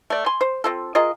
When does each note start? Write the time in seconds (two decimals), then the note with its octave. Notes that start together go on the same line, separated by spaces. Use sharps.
0.10 A3 D5
0.26 G#5 C6
0.41 C5
0.64 C4 F4 A4
0.95 F4 G#4 A#4 D#5